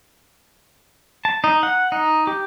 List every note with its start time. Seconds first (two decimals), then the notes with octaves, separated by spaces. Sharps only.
1.25 A5
1.44 D#4
1.63 F#5
1.92 D#4
2.27 G4